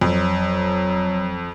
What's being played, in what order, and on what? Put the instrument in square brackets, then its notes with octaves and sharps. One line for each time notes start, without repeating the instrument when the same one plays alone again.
[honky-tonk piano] F2 [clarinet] F#3